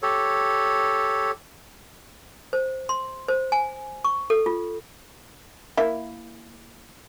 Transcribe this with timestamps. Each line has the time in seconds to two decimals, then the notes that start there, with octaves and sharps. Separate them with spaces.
0.03 G4 A4 C#5
2.53 C5
2.89 C6
3.28 C5
3.52 G#5
4.04 C#6
4.30 A4
4.46 F4
5.77 A#3 E4 E5